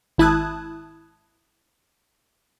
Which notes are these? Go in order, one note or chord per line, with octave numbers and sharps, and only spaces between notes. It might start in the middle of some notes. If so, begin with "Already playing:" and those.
G#1 E4 A5 D#6 F#6 G#6